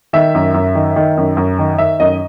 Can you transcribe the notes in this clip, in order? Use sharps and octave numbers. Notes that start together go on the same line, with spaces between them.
D#3 E5
F#2
F#2
D#3
D#3
F#2
F#2
D#3
D#3 E5
F#2 D#5